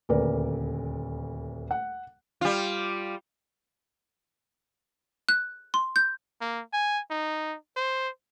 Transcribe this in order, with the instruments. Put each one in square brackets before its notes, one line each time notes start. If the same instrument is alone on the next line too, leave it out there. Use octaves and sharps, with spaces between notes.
[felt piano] D#1 D2 A#4 B4 D5
F#5
[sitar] G3 F4
[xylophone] F#6
C6
G6
[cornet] A#3
G#5
D#4
C5